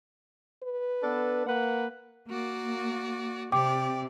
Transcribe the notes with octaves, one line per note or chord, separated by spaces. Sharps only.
B4
B3 D4 A4
A#3 B4 F#5
A#3 F#4 D5
C3 G4 D5 G5 D6